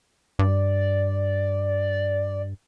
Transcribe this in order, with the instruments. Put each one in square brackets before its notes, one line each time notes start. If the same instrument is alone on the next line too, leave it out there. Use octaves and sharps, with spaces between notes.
[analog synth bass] G2 [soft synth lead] D5